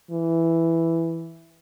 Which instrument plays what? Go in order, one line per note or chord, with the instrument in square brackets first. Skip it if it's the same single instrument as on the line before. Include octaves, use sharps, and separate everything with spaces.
[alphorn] E3